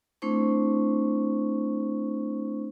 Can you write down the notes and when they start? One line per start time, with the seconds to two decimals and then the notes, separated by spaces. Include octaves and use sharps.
0.22 A3 C4 D4 E4 C5 C#6